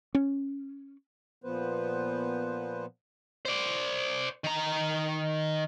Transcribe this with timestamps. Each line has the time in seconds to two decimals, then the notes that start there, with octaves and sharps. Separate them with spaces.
0.15 C#4
1.44 A#2 F3 B3 B4 C5
3.45 C5 D5
4.44 D#3 A#5